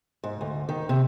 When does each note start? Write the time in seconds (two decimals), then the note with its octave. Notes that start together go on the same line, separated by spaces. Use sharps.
0.24 G#2
0.41 D2
0.69 D#3
0.89 C3